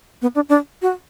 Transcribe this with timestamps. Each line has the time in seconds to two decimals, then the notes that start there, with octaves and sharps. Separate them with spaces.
0.22 B3
0.35 D4
0.49 D4
0.82 F#4